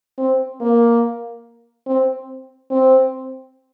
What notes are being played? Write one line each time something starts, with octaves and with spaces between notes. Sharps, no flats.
C4
A#3
C4
C4